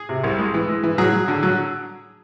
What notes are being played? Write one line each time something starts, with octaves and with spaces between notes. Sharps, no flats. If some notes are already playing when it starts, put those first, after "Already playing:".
Already playing: G#4
C3
C2
G#3
E3
G#3
E3
F#3 G#4
F#3
D3
F#3